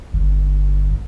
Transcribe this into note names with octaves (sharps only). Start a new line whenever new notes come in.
G1